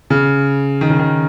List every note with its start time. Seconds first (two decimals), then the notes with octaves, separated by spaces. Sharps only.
0.10 C#3
0.81 D#3
0.90 C#3
0.99 D#3